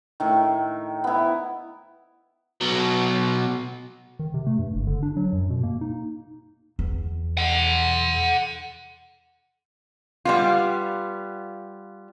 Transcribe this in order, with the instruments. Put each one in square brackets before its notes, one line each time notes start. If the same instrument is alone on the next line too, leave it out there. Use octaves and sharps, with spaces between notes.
[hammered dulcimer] A2 D#3
B3 E4
[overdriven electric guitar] B2 F#3
[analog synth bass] D#3
C3
A3
G2
F#1
D3
D4
F#3
F#2
B2
A#3
D#4
[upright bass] E2
[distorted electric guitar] F#5 C6
[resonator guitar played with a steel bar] G3 B3 F4